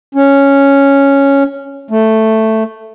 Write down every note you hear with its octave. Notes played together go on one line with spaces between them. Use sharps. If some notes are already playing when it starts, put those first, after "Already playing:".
C#4
A3